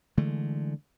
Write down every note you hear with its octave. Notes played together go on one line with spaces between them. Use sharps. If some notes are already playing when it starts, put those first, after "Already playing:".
D3 E3 G#3 A3